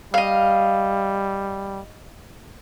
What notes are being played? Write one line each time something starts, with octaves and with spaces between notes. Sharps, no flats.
G3 D#5 F5